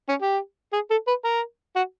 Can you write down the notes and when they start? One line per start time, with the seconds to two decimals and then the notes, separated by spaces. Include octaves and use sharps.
0.09 C#4
0.22 G4
0.73 G#4
0.90 A4
1.07 B4
1.24 A#4
1.76 F#4